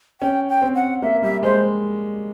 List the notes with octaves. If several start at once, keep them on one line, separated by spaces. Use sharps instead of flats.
C#4 G5
G5
C4
F#5
A#3 E5
G3 E5
G#3 C5